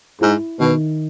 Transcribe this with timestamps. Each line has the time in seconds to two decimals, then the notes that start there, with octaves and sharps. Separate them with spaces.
0.21 G#2 E4
0.59 B2 D#3